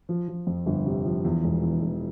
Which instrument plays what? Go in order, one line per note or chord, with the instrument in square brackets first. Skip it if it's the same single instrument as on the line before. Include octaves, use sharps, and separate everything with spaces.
[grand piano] F3
F3
F2
G1
C3
F3
E2
E1
E2
E1